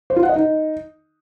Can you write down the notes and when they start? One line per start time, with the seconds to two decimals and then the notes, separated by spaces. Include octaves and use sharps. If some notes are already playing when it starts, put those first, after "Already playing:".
0.10 C5
0.16 F4
0.23 F#5
0.29 D#5
0.36 D#4